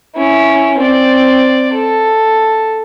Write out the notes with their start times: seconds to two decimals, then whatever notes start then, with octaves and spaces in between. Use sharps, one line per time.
0.16 C#4 E4
0.78 C4 D5
1.73 A4